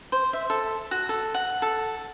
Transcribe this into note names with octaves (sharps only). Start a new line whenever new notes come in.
C5
E5
A4
F#4
A4
F#5
A4